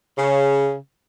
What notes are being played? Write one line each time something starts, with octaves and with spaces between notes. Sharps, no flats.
C#3